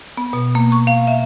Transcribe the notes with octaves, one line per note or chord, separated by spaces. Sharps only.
B3
B2
A#3
C#6
F5
E5